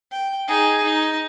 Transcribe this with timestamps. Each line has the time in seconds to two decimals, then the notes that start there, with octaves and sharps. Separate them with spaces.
0.12 G5
0.48 D#4 G#4
0.83 D#4